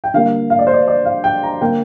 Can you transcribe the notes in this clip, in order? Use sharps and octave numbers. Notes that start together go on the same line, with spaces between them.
G5
D3 G3 A#3 F5
F5
D5
C5
D5
D5
F5
G5
A#5
D3 A#3 G5